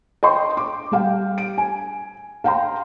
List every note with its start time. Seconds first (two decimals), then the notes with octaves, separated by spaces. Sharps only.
0.23 D#5 G5 C6 C#6
0.57 D6
0.91 G3 G4 F5 G5
1.38 D7
1.58 G#5
2.44 F5 G5 A#5 C6